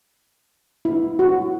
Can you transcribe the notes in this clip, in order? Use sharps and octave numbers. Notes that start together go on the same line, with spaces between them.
E4
F#4